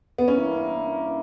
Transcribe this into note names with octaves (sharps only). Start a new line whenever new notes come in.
B3
G2 E3 A#3 C#4 E4 A#4